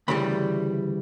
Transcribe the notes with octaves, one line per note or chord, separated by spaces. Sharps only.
D2 C#3 E3 G3 B5